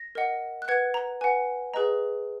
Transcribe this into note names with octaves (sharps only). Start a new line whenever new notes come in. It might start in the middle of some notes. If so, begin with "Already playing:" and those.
Already playing: A#6
A#4 D#5 F#5
F#6
B4 F#5 G#6
A#5
B4 F#5 G#5
G#4 B4 D#5 A#5